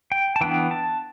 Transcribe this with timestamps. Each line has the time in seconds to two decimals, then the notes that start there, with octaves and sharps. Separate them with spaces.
0.12 G5
0.36 A5
0.41 E3 B3 D4 G5
0.71 A5